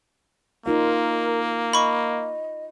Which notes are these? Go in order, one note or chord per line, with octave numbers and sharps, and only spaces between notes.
A#3 D#4 F4 A#4 F5
D#5 B5 C#6